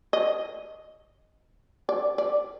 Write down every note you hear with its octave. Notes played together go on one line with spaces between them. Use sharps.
D#5
D5
D5